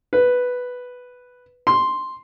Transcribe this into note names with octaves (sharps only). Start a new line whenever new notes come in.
B4
C6